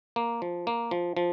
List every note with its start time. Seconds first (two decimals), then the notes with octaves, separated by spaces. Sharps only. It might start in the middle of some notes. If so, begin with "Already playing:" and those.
0.16 A#3
0.42 F3
0.67 A#3
0.91 F3
1.17 F3